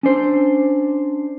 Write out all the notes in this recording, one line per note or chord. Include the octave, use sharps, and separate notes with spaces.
C#4 D4 C5